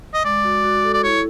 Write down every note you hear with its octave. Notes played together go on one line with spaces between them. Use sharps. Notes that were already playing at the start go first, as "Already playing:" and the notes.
D#5
G#3 D5
F#4
F#4
A4
D5
E4 C#5